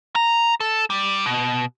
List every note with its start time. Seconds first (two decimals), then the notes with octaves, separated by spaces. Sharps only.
0.15 A#5
0.60 A4
0.90 G3
1.26 B2